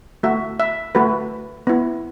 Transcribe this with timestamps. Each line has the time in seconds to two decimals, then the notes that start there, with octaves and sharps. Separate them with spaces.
0.23 A3 F#4 E5
0.60 E5
0.95 A3 F#4 B4
1.67 B3 E4